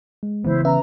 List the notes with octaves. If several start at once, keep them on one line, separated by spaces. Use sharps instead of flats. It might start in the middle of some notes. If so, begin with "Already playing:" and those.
G#3
C#3 E3 B3 E4 C5
C#4 B4 E5 A#5